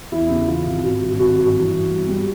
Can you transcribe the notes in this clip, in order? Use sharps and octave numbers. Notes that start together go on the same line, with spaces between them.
E2 E4
C#3
E3 F4
G#1
G#1 F#4
G2
G#1 F#4
G2
E3
E3
G3
G3